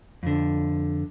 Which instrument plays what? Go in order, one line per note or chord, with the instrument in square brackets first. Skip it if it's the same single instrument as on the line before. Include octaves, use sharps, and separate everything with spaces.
[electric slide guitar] F2 D3